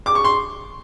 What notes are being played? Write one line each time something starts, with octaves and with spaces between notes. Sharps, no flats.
D6
C#6
C6